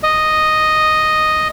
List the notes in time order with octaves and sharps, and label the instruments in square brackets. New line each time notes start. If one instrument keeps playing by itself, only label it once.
[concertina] D#5